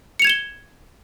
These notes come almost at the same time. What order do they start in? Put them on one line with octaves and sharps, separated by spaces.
C#7 F7 G#6 E7 G7